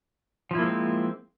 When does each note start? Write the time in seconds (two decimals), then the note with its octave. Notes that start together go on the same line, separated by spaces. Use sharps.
0.51 F3
0.55 E4
0.59 A#3
0.63 G#3
0.67 C4